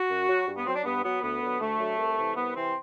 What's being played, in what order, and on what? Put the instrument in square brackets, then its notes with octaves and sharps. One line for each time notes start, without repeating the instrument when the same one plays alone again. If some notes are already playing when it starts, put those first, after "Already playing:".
Already playing: [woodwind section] F#4
F#2
F#3
G2
B3
F#3 C4
D4
G2 B3
F#3 B3
D2 B3
D3 F#3
D2 A3
D3 F#3
C2
C3 E3
C2 B3
C3 E3 C4